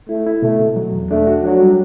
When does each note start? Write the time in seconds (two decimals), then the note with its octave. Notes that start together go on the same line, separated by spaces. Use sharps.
0.09 A3 E4
0.26 E4
0.42 B2 A3
0.59 B2
0.76 F#3
0.93 E2
1.10 A3 D4
1.27 F#4
1.43 F#3 D4
1.60 G3